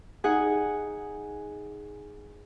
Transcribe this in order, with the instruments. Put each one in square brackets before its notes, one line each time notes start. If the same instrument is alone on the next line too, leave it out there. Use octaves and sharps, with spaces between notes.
[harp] D#4 G#4 F#5 G#5